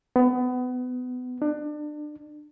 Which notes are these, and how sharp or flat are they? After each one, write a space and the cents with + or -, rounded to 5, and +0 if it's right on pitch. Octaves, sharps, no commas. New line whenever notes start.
B3 +25
D4 +30